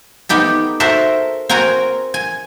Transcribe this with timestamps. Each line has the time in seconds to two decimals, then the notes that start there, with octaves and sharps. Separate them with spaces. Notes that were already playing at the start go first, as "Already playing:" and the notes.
0.29 B3 D#4 G4 A4
0.80 F#4 A4 A#4 C5 E5
1.49 C4 F#4 A#4 G#5 A#5
2.14 G#5